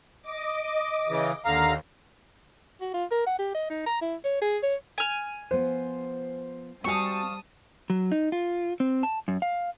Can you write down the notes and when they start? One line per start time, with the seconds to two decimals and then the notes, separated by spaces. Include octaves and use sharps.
0.22 D#5 D6
1.08 C#3 E3
1.45 D#2 D3 F5 A#5
2.81 F#4
2.94 F4
3.11 A#4
3.27 F#5
3.39 G4
3.54 D#5
3.70 D#4
3.86 A#5
4.01 E4
4.25 C#5
4.42 G#4
4.63 C#5
4.98 G#5 F6
5.51 F3 B3 C5
6.84 G3 C4 F#4 F5 G#5 A5 C#6 D#6
7.90 F#3
8.12 D#4
8.32 F4
8.80 C4
9.03 A5
9.28 F#2
9.42 F5